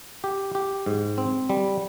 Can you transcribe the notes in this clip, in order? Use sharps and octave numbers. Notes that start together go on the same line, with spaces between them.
G4
G4
G#2
C4
G3